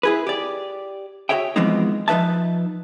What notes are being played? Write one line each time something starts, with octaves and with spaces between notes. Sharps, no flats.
E4 G#4 B4
G4 D5
F#4 G#4 C#5 E5 G5
E3 F3 G#3 B3 C4 D#4
F3 D#4 B4 E5 A5